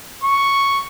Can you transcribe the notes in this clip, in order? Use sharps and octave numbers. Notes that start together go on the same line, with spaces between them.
C#6